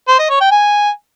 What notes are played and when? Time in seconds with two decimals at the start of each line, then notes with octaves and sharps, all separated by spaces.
0.08 C5
0.19 D#5
0.30 C#5
0.41 G5
0.51 G#5